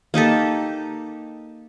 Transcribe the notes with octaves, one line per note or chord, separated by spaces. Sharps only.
A#3 D#4 G4 A4